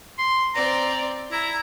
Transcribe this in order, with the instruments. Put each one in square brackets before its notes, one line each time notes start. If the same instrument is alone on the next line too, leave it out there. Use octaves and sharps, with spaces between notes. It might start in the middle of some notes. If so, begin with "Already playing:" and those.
[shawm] C6
[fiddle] C4 D5 [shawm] A#5
[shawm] E4 [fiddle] A#5